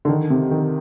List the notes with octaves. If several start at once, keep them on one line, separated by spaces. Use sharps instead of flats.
D3
D#3
C3
D#3